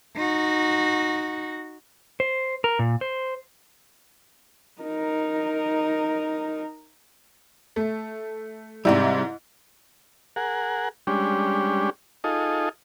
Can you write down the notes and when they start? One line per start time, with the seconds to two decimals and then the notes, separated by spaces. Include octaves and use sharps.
0.16 D#4 F#4
2.20 C5
2.64 A#4
2.79 A#2
3.01 C5
4.82 D#4 A#4
7.76 A3
8.85 G#2 C3 G3 E4
10.36 G#4 A#4 F#5
11.07 G3 G#3 C#4 D4 G4
12.24 D#4 F4 G#4 A4 D#5